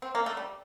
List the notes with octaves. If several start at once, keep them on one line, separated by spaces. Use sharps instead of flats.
C4
A#3
A3
G3